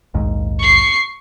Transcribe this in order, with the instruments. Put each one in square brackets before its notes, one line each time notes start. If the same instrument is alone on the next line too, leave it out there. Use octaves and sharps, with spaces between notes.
[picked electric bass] A#1 D#2 G#2
[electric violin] C#6 C7